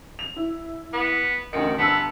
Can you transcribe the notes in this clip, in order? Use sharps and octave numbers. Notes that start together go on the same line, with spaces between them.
F7
E4
B3
A1 D2 D#3 C#7
G1 B3 A5 E6